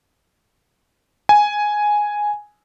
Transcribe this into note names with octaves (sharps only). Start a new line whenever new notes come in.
G#5